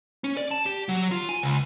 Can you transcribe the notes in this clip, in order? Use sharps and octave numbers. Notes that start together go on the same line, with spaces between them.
C#4
D5
A5
G4
F#3
F4
G#5
C#2